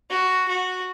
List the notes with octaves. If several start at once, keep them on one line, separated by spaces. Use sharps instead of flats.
F#4
F#4